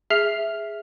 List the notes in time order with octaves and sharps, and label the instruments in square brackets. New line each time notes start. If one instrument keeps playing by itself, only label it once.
[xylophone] G#4 E5 F6 C7 F7